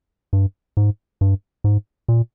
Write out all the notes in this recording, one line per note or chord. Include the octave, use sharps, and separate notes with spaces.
G2
G#2
G2
G#2
A#2